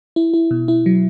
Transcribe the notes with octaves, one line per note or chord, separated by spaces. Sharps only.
E4
E4
B2
E4
F#3